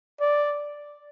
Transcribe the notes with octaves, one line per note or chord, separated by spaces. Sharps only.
D5